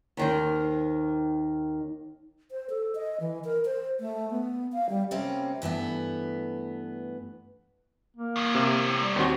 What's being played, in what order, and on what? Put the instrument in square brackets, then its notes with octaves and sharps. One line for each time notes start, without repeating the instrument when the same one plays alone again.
[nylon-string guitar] D#2 D#3 C5
[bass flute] C5
A4
D#5
E3
A#4
C5
A3
B3
F5
G3
[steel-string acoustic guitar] C3 G3 A#3 C4 C#4
G2 E3 A3 B3
[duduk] A#3
[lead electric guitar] E2 A2
[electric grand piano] C3
[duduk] G3
[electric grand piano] D#2 C4 F#4